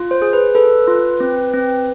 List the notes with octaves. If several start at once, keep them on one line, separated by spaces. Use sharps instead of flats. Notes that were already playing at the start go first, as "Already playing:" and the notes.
Already playing: F4
C5
G#4
B4
A4 B4
F4
C4
C4